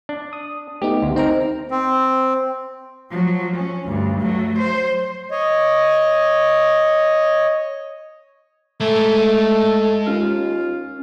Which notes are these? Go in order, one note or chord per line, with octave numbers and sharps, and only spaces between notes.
D4
D#6
A3 B3 D#4 G4
D2
C4 D#4 A#4 C5 A#5
C4
F3 F#3
C#4
D2 G2
F#3 A3
C5
C#5 D#5
G#3 A3 A4 A#5
D#2 C#4 F4